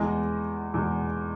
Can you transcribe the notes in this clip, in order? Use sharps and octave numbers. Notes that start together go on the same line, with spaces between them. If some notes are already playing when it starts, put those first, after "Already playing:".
Already playing: E2 B2 G#3 D#5
E2 B2 G#3